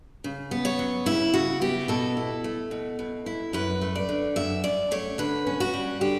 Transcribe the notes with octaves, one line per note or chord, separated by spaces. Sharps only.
C#3
B3
C#5
F#3
C#3 E4
C#3 F#4
B3 G4
B2 A4
E4
A3
B2
B2
E4
F#2 B4
A3
D5
D3
F#2 E5
F#2 D5
A3 C#5
D3 B4
C#4
F#4
G3
D3 G4